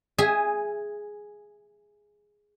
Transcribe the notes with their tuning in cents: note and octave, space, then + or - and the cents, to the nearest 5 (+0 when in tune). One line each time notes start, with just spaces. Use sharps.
G#4 +0 E5 +0 G#5 -20